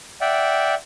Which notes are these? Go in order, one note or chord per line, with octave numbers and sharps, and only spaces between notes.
D5 E5 F#5 G5